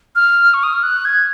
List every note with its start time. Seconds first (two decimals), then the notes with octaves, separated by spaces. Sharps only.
0.16 F6
0.54 C#6
0.63 D#6
0.73 F6
0.83 F#6
1.05 G#6